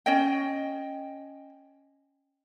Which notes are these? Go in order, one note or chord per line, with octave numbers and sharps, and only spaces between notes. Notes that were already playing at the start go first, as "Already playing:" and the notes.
C#4 D#5 G5